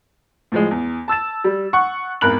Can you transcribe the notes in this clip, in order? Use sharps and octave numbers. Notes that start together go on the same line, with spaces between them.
A2 F3 G#3
E2
A5 E6 A6 E7
G3
F#5 C#6
G#1 E2 A#4 B5 F#6 F#7